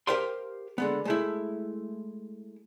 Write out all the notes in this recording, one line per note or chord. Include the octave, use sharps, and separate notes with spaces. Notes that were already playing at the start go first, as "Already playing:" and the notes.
G4 A#4 C5 F5 G5 C6
D3 G#3 B3
G#3 A3 E4